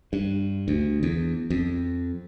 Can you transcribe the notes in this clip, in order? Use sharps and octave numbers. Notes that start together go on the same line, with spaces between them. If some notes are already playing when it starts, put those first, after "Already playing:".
G2
D2
E2
F2